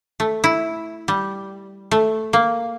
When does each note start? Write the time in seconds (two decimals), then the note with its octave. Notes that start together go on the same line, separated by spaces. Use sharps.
0.20 A3
0.44 E4
1.08 G3
1.91 A3
2.33 A#3